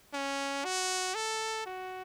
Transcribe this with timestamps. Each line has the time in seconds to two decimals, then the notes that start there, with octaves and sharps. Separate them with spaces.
0.14 C#4
0.65 F#4
1.15 A4
1.66 F#4